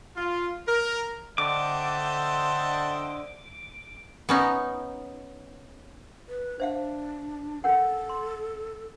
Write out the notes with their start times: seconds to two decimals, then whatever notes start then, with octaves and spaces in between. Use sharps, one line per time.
0.16 F4
0.68 A#4
1.38 D3 C5 D#5 E5 F#5 G5 A5 D6
4.29 B3 C#4 D#4
6.29 B4
6.60 D4 C5 E5 F5
7.64 C#4 A4 A#4 F#5
8.09 C6